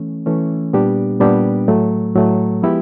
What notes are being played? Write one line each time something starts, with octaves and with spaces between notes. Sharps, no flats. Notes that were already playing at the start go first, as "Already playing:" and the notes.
Already playing: E3 A3 C#4
E3 A3 C#4
A#2 G3 B3 D4 G4
A#2 G3 B3 D4 G4
A2 F#3 A3
A2 F#3 A3
F3 G#3 B3 E4 G4